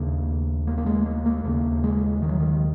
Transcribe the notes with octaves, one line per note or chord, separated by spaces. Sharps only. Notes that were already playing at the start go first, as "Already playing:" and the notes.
Already playing: D#2 C#3 A#3
A#3
A#3
G#3
A#3
A#3
D#2 C#3 A#3
G#3
D#3
F#3
D#3